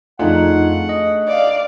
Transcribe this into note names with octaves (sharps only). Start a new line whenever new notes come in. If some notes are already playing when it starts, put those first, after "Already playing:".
F2 A3 D4 D#4 F4 G#4 F#5
D#5
D5 F5